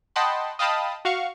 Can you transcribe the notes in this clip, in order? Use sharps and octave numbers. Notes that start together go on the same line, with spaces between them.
D#5 F#5 G5 A5 B5 C6
D#5 F5 G5 A5 B5 D#6
F#4 F5 C#6